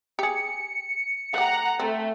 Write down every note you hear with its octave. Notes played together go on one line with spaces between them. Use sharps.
G4 G#4 C#7
A3 G4 F#5 A#5
A3 C4